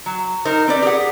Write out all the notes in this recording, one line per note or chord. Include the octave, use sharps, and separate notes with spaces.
F#3
D#4 A#4 C5
C4 B4 D5
G4 G#4 F#5